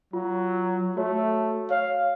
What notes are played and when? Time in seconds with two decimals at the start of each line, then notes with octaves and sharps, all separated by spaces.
0.13 F#3 F4
0.97 A3 F#4 C#5
1.71 C#5 F5